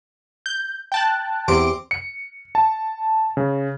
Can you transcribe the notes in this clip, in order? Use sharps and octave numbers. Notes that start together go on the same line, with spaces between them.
G6
G5 A5 F#6
E2 C4 G4 C6 D7
C#7
A5
C#3